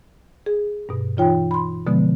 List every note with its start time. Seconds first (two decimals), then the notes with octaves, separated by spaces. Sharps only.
0.46 G#4
0.89 G2 B2
1.17 E3 D#4 F4 C#5 G5
1.51 B5 C6
1.86 B2 D3 F3 G#3 B3